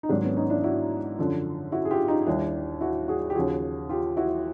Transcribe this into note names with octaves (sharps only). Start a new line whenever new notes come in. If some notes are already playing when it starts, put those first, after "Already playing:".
D#4
G#2 D#3 F#3 C4 D4
B3 C#4
C#4 D#4
D4 E4
E4 F#4
F#2 D3 F3
E4 F#4
G#4
F4 G4
D#4 F4
D#2 D#3 G3 D4 E4
E4 F#4
F#4 G#4
G4
D#2 C#3 F3 F#4 G#4
F4 G4
E4 F#4